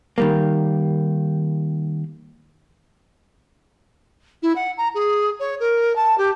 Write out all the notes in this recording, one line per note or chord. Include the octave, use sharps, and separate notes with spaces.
D#3 G3 A#3
E4
F#5
A#5
G#4
C#5
A#4
A5
G4